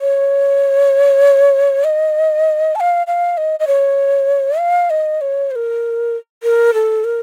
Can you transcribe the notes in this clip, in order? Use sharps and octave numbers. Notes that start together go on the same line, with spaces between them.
C#5
D#5
A5
F5
F5
D#5
D#5
C#5
F5
D#5
C#5
C5
A#4
A#4
A4
A#4